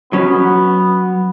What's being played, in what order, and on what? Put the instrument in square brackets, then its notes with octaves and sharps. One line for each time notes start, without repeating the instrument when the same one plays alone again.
[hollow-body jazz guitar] F#3 C#4 B4 [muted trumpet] B3